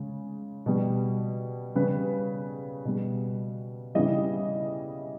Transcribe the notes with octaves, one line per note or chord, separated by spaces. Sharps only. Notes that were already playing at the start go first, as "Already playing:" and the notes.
Already playing: C#3 G#3
B2 G3
C#3 G3 B4
B2 G3
C#3 E3 G3 D#5